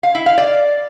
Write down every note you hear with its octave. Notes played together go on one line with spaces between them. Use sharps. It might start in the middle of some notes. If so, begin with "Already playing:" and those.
F5
E4
F5
D5